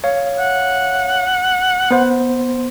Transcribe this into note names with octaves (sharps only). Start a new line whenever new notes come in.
C#5 F5
F#5
B3 C5